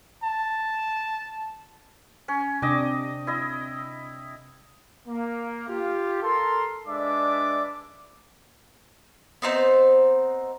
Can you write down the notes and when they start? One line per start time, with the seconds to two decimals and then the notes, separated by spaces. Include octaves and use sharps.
0.23 A5
2.28 C#4
2.62 C3 D4 D#5 G5 D6
3.27 E4 D#5
5.08 A#3
5.69 F4 G4
6.23 A4 A#4 C6
6.87 G#3 D4 B4 D5 E5 D6
9.42 B3 C4 D#4 C5